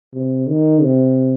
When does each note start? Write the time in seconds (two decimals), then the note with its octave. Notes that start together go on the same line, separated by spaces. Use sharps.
0.14 C3
0.48 D#3
0.82 C3